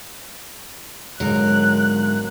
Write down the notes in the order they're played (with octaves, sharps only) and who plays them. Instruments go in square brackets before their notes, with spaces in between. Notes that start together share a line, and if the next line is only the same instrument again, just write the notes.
[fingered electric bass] G#2 D3 G#3 [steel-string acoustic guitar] F#3 A#4 [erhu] F#6